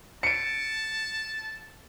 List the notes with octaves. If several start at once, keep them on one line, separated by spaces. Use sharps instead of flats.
A5 C#7 D7